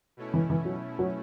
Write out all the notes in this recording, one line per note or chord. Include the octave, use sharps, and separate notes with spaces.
B2 A3 C#4 E4
E3
E3
F#3
F#3